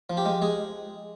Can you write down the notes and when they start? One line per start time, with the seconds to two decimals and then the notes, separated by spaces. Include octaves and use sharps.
0.10 F3
0.17 G4
0.25 G#3
0.42 G#3 G#4